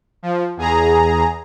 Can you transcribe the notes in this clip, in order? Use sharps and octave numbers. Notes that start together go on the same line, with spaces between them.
F3
E2 G#4 A#5